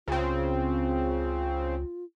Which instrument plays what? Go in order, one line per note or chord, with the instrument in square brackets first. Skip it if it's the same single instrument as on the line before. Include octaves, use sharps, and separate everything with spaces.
[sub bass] C#2 [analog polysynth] C#3 C4 [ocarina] F4